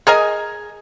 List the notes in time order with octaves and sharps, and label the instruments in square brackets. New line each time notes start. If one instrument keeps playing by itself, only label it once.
[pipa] G#4 A#4 D#5 G#5